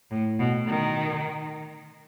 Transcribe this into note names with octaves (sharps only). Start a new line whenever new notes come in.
A2
B2
D#3